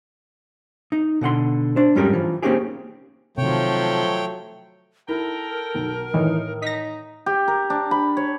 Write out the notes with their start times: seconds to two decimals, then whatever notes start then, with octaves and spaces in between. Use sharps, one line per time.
0.92 D#4
1.21 B2 D3 F#5 C6
1.76 D4 C5
1.95 F2 G#2 G3 C#4 G4 A#4
2.13 E3 F3
2.43 A#3 C4 C#4 D#4 G4 G#4
3.38 C3 D#3 F3 F#3 A3 C#5 G5
5.08 E4 A4 A#4 G5 A#5
5.75 B1
6.14 A2 D#3 E3 D#4
6.62 D#4 A#6 B6
7.26 G4
7.48 A#4
7.70 D4
7.91 B5
8.17 C#5